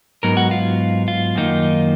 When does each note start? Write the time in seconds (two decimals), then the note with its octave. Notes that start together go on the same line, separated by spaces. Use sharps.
0.23 G#2 F#3 B3 D#4 A#4
0.37 F#4
0.51 F4
1.08 F4
1.35 F#2 D#3 A#3 D#4